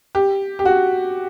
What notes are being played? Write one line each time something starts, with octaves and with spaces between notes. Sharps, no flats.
G4
G4
F#4